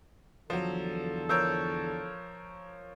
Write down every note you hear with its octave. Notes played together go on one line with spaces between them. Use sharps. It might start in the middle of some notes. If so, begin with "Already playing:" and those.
E2 D3 F3 F#3 A4
F3 A#4 C#5 E6 G6